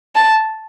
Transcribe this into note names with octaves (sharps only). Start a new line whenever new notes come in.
A5